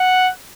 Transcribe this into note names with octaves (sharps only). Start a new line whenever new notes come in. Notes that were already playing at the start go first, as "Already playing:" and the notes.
Already playing: F#5